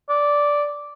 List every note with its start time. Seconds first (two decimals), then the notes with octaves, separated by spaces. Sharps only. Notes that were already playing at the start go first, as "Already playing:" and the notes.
0.09 D5